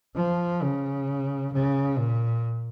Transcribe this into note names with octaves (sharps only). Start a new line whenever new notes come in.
F3
C#3
C#3
A#2